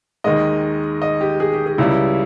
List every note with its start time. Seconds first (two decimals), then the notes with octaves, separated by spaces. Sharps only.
0.24 D#2 D#3 G#3 D#5
1.02 D#5
1.21 G4
1.40 G#4
1.53 G4
1.66 G#4
1.78 C#2 C#3 G3 E4